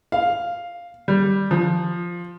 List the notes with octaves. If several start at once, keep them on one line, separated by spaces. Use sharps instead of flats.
F5
G3
F3